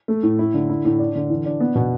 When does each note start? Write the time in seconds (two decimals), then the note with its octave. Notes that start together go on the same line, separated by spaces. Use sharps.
0.08 A3
0.23 A2
0.39 E4
0.54 D3
0.70 E4
0.85 A2
0.99 D4
1.15 D3
1.30 E3
1.46 D4
1.60 B3
1.75 B2